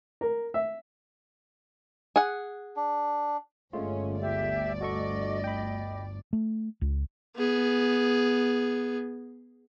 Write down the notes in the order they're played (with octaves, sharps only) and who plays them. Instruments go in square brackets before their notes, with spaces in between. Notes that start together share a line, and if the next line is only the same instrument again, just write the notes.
[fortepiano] A#4
E5
[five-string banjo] G#4 F#5
[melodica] D4
[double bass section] G1 [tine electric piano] G#3 A3 F4 [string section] C#4
[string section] D2 D5 [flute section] G4 E5
[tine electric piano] F#4 A4 C#6 [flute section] D#5
[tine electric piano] G5 B5
[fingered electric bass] A3
C#2
[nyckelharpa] B3 G#4